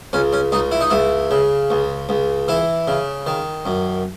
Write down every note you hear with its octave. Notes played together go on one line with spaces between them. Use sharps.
C#2 C#4
C#4
C#2 D#4
E4
D#4
C#2 E4
C#3
C#2
C#2
E3 E4
C#3
D#3
F#2